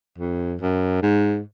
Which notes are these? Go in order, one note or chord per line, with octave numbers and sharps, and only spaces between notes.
F2
F#2
G#2